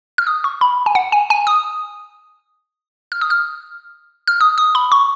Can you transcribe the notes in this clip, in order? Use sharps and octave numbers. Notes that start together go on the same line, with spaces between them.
F6
D#6
C#6
B5
G#5
F#5
G#5
G#5
D#6
F6
D#6
F6
F6
D#6
D#6
B5
C#6